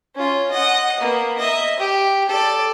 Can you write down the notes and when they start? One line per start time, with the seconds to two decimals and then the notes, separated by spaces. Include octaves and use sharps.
0.15 C#4 F4
0.51 D#5 F#5
1.00 A#3 B3
1.38 D#5 E5
1.79 G4
2.29 A4 D5